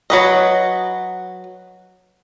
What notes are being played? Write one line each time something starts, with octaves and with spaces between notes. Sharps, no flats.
F#3 B4 D#5